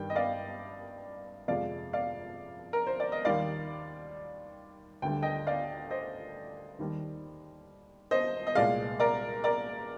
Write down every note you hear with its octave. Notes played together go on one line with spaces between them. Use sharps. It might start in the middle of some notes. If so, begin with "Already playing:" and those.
Already playing: G2 D#3 G3 G5
D#5
D5 F5
F2 C3 F3 G#3 D5 F5
D5 F5
A#4
C5
D5
D#5
D#2 D#3 G3 D5 F5
D2 D3 G3 G5
D#5 G5
D5 F5
C5 D#5
D#2 D#3 G3
C5 D#5
D#5
C2 A#2 G#3 D5 F5
A#4 D5
A#4 D5